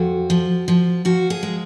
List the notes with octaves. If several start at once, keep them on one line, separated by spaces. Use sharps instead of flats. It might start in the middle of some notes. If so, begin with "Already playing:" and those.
Already playing: F2 F#4
F3
F3
F3 F#4
G#4
G#3